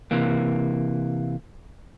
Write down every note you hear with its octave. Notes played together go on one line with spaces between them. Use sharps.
C3 E3 A#3